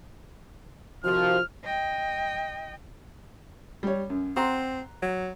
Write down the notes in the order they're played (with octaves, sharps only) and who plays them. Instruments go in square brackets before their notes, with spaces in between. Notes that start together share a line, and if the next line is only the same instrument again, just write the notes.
[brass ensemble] C3 D#3 F3 [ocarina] F#4 [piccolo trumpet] F6
[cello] D#5 G5
[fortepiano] G3 C#5
F#2
[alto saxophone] C4 [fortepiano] F#5 A#5 C6
[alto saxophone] F#3